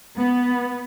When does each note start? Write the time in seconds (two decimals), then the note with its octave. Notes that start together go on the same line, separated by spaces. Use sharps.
0.17 B3